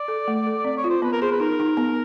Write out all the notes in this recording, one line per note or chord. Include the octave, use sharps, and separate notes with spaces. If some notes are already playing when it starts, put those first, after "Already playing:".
Already playing: D5
A4
A3
A4
C4 D5
C#5
F4
C5
B3 B4
A#4
G#4 C5
B4
D#4 A#4
D#4
B3